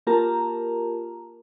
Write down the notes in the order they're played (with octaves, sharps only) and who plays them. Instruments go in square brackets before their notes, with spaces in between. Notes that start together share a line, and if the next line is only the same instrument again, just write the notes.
[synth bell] A#3 F4 G4 A#4 A5 A#5